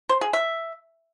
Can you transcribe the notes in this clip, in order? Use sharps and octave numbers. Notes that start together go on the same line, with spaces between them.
C5
G#4
E5